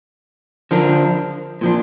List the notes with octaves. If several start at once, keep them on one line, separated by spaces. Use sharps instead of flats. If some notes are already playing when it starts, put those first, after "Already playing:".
D3 F3 D4 A#4
A#2 F3 D4